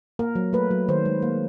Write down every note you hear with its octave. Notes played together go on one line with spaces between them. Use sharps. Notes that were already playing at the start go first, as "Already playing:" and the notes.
A#3 A#4
F#3
A3 B4
F#3
D#3 C5
G#3
A#3